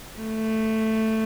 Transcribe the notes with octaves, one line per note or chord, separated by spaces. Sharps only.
A3